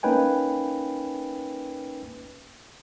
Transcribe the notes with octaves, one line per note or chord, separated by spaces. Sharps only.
A#3 C#4 D#4 B4 G5 G#5